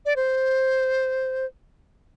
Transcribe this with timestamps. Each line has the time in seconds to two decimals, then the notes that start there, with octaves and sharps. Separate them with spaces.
0.06 D5
0.16 C5